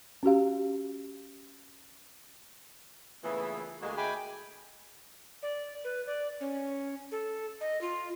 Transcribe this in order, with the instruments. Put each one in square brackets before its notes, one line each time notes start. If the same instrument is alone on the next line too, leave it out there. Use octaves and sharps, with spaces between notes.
[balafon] C#4 F#4 G4 F5
[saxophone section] A#2 C#3 E3 [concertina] A3 B3 G#4
[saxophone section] D2 G#3 [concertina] A#3 F#4 G#4
[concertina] A3 D6 [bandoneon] G5 G#5 B5
[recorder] D5
B4
D5
C#4
A4
D#5
F4